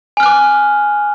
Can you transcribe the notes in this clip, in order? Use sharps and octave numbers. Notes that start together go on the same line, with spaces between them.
G#5 D6 F6 F#6